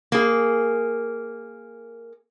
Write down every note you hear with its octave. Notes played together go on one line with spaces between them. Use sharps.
A#3 G#4